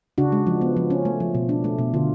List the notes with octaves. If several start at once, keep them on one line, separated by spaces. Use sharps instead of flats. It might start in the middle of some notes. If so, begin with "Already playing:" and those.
C#3 D4 F#4
G#3
F3
B3
F3
C#4
A3
F3
B2
D4
A3
B2
D3 F4